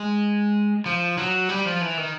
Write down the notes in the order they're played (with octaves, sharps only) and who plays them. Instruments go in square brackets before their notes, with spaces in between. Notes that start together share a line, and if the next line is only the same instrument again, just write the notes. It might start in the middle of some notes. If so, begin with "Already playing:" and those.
Already playing: [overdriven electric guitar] G#3
F3
F#3
G3
F3
E3
D#3